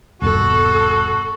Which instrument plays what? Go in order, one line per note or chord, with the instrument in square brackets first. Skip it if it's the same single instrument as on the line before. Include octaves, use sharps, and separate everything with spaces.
[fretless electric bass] D#1 G2 B2 [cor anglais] F#4 [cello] A4